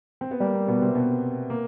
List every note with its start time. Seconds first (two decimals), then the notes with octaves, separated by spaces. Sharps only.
0.21 C4
0.31 B3
0.40 G3 A#3
0.54 A#3
0.67 B2 B3
0.82 C3 C4
0.95 B2 B3
1.50 A#3